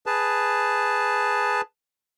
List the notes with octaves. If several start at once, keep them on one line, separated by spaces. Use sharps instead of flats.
G#4 B4 A5